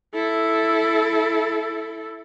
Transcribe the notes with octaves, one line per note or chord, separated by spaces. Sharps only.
E4 A4